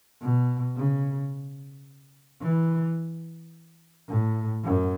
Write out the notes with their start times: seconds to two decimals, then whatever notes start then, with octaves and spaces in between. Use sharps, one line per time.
0.21 B2
0.76 C#3
2.42 E3
4.08 A2
4.64 F#2